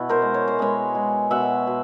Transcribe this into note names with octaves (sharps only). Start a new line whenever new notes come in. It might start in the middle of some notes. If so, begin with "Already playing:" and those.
Already playing: B2 E4 F#4
A#4 C5
G#3
C#5
C5
G#3 B4 C#5
G#3
B2 E5 F#5
B2